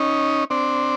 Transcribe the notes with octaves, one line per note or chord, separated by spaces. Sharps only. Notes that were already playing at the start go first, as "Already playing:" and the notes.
Already playing: C#4 D#4
C4 D4